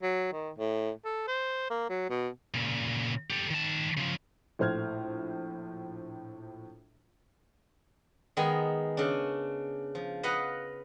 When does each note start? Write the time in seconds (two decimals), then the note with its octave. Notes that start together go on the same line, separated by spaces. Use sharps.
0.02 F#3
0.32 D#3
0.58 A2
1.04 A4
1.28 C5
1.70 A#3
1.89 F#3
2.10 B2
2.54 A#2 C#3
3.30 G4 A4
3.51 D#3 A5
3.97 C#3 F3
4.59 A#1 A2 C5 F6 G#6
8.37 D#3 G#3 B3 G#5 A#5
8.97 C#3 D4
9.95 F3
10.23 B4 D#5 F5 F#5